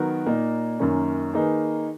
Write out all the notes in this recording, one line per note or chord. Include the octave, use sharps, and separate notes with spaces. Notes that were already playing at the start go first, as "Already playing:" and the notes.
Already playing: D#3 F#3 B3 F#4 A#4
A#2 A#3 D#4
F#2 D#3 A#3 C#4
D#3 A#3 D#4 G#4 B4